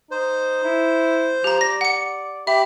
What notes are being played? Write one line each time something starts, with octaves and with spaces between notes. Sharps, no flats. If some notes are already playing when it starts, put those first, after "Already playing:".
D#4 C5
E4
F3 G4 A#5
D5 A#6
F#5 C#7
G4 E5 B5